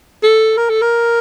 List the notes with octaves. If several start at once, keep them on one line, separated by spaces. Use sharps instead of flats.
A4
A#4
A4
A#4